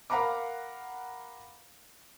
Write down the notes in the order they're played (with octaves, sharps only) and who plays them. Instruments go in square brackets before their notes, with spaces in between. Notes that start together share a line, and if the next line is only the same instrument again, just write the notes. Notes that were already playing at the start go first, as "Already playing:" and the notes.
[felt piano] A#4 F5 F#5 A#5 B5 D6